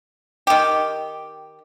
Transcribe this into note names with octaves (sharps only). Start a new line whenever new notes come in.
D#3 G4